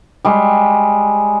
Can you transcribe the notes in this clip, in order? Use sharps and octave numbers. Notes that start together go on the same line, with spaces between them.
G3 G#3 C#6